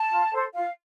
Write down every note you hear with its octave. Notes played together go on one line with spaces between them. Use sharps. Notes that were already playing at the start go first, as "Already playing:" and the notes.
Already playing: A5
F4
A4 C5
F4 F5